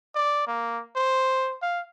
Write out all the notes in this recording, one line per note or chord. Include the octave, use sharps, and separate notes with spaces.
D5
A#3
C5
F5